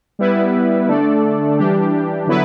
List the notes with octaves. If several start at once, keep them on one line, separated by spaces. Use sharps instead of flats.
G3 B3 E4 B4
D3 A3 D4 A4 D5
E3 G3 D4 G4
D3 F#3 B3 E4 B4